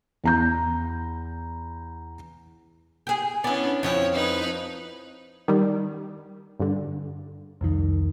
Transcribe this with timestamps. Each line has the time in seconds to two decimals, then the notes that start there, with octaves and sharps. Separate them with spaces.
0.24 E2 A#5 G6
3.07 G4 G#4
3.44 B3 C#4 D4 E4
3.83 F2 F3 E4 C#5
4.13 D#4 B4
5.48 D#3 G3
6.60 G2 D3
7.61 C2 F2 D#3